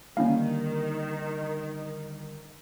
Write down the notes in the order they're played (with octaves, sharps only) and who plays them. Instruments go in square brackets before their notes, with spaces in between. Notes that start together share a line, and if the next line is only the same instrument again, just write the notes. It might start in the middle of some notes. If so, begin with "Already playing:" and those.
[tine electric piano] D3 G3 [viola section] D#3 [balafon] A#3 [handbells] C#4 E4 F5